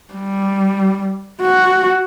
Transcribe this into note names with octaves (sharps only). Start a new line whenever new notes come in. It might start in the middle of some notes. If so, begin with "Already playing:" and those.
G3
F#4